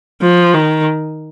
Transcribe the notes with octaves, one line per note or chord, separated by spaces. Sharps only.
F3
D#3